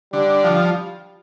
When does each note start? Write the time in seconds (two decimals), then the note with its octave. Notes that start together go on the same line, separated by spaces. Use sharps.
0.13 D3 G3
0.44 F3